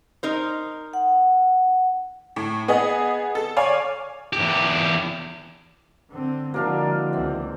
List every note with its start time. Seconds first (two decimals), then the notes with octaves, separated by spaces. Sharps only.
0.23 D#4 A#4 C5
0.93 F#5
2.36 A2
2.68 B3 G#4 D#5
3.35 A4
3.57 C#5 D5 F5 G#5
4.33 E2 G4
6.10 D3 C4
6.54 D3 F3 G#3 A#3 D4 E4 F#4 F5
7.13 C#2 E3 C4